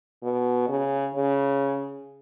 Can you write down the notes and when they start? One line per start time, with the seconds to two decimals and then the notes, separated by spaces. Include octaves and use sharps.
0.23 B2
0.68 C#3
1.15 C#3